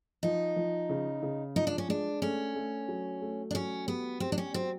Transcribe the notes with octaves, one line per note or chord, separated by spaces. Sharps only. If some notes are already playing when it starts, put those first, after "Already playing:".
F3 D#4
F3
C#3
C#3
F3 D#4
D4
C#4
G#3 D4
A3 C#4
A3
F#3
A3
D4
F#3 C#4
B3 G4
C4 G4
D4
C#4
F#3 C4